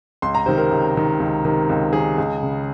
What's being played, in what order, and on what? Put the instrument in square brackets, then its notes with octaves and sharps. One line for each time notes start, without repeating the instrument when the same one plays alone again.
[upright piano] C#2 C6
A#5
C3 D#3 C5
A#4
C#2
C3 D#3
C#2
C3 D#3
C#2
C3 D#3 G#4
C#2
C#3